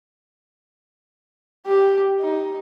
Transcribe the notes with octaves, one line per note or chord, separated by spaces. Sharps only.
G4
D#4